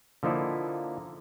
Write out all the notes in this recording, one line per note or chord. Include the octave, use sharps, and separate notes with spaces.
D3 F3 A#3 D#4 E4